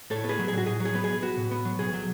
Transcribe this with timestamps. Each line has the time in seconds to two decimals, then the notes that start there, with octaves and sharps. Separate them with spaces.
0.10 A2 A4 C#5
0.24 B3
0.29 G#4 B4
0.39 F#3
0.48 G#4
0.53 A2 F#4
0.66 A2 G#4
0.80 F#3
0.85 G#4
0.95 B3
1.04 G#4
1.09 B1
1.22 B3 F#4
1.37 A2
1.51 B3
1.65 F#3
1.79 B1 G#4
1.94 F#3